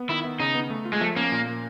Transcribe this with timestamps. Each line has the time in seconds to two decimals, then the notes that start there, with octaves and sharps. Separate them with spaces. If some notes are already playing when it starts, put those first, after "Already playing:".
Already playing: B3
0.09 D#3 E4
0.25 B3
0.40 C#3 D#4
0.55 B3
0.70 A3
0.85 F4
0.93 G#3
1.01 F3 A3
1.16 A#3 C#4
1.32 A#2
1.47 A#3